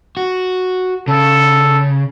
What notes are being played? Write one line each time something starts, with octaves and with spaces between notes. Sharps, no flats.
F#4
C#3 A4